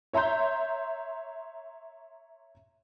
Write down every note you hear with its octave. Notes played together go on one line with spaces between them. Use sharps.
C#5 E5 A#5 C6 G6